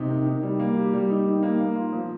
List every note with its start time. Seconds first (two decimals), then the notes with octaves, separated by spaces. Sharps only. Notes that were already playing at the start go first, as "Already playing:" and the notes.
Already playing: C3 D#4
0.09 D#3
0.26 D#3
0.43 G3
0.60 A#3
0.76 G4
0.93 G3
1.10 D#4
1.26 D#3
1.43 A#3
1.60 A#3
1.76 F4
1.92 F3